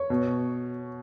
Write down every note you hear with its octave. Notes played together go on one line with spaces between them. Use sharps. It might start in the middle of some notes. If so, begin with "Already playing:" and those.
Already playing: C#5
B2